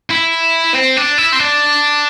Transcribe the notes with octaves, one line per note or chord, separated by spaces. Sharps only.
E4
C4
D4
E4
C4
D4